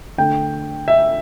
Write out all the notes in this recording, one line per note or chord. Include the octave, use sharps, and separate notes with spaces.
D3 A3 D4 G5
E5